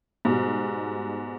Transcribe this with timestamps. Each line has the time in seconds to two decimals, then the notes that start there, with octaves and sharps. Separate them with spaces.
0.25 G#2 B2 G3